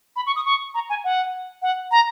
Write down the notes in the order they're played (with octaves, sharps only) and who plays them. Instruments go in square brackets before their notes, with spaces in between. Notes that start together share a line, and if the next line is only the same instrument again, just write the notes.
[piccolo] B5
C#6
D#6
C#6
A#5
G#5
F#5
F#5
A#5